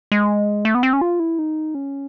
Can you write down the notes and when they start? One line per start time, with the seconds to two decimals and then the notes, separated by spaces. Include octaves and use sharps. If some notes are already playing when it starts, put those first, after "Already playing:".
0.12 G#3
0.65 A3
0.75 B3
0.83 C4
0.93 C#4
1.01 F4
1.20 E4
1.39 D#4
1.75 C#4